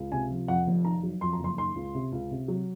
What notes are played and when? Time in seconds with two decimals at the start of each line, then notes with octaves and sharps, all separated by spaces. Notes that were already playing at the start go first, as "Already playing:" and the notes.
Already playing: C#2
0.12 C3 G#5
0.30 F3
0.48 F2 F#5
0.67 F1
0.85 D#3 A#5
1.03 F#3
1.21 F2 C6
1.33 A#5
1.39 F#1
1.44 C6
1.58 D#3 C6
1.75 C#2
1.95 C3
2.12 C#2
2.31 C3
2.48 F#3